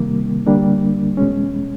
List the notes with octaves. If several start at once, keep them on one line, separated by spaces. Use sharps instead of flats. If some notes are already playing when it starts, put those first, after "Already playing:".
Already playing: C3 D#3 G3 A#3
D3 G3 A#3 D4
E2 B2 G#3 C#4